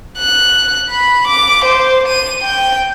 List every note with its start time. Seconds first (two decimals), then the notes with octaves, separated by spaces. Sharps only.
0.18 F#6
0.90 B5
1.28 D6
1.65 C5
2.08 D#7
2.42 G5